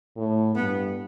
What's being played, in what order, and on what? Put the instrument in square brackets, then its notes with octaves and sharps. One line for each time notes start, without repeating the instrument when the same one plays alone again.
[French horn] A2
[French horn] G2 [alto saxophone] B3